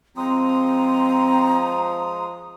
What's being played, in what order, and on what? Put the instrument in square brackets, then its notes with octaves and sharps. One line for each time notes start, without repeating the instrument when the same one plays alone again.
[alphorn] F3 [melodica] G#3 D#6 [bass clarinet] C4 [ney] A#5